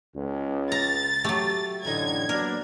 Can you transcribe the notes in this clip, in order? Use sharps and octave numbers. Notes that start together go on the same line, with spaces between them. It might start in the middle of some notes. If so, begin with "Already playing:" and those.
C#2
A#5 A6
F#3 A3 G4
A1 F#2 A2 D3 D#4 D#5 G#6
F#3 A#3 B3 D4 A#4